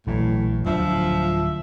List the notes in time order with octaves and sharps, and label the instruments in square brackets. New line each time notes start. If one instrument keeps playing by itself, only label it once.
[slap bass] A#1 E3 F#3 [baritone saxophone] A2
[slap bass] D1 F#3 D4 [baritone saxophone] F3 [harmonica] E5